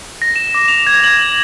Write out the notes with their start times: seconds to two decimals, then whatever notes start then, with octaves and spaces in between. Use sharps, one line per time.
0.22 A#6
0.36 E7
0.55 D6
0.68 F7
0.87 G#6
1.04 F#7
1.20 F#7